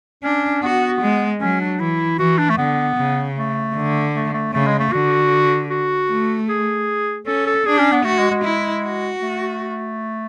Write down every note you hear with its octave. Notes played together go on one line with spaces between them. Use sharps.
C#4 D4
B3 F#4
G#3
F#3 C#4
D4
E3 E4
E3 F#4
D4
A3
D3 B3
C#3
A3
D3
A3
A3
C#3 A3
G#3
A3
D3 F#4
F#4
A3
G#4
C#4 A4
A4
D4 G#4
C#4
B3
A3 F#4
G#3
G#3
E4
F#4
A3